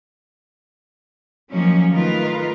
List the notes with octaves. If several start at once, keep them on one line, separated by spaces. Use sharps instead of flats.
D#3 F3 F#3 A#3 C#4
D#3 A3 F4 A#4 B4